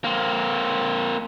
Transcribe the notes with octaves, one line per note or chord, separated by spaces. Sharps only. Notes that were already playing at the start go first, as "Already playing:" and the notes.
A#3 C4